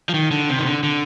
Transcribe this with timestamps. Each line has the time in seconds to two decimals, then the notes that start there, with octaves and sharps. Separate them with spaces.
0.09 F3
0.14 D#3
0.31 D3
0.49 C3
0.58 D#3
0.66 D3
0.83 D3